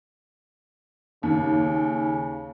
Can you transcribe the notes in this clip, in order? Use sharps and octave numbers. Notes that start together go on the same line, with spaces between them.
D#2 C#3